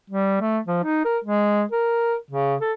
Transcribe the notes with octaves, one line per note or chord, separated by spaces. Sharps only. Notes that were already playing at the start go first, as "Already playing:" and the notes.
G3
A3
F3
D#4
A#4
G#3
A#4
C#3
A4